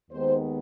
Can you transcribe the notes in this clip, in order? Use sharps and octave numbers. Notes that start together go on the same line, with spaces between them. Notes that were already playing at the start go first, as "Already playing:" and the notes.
D#2 D#3 G#3 B3 C5